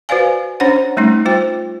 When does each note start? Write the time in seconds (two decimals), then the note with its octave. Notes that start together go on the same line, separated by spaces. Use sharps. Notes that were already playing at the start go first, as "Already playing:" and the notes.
0.09 F#4 B4 C5 D5 F5 G#5
0.60 C#4 D4 C5 C#5 F#5
0.97 G3 A3 C#4 D#4
1.25 G3 F4 C5 G5